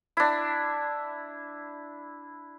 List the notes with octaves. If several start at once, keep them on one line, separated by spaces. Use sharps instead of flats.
D4 E4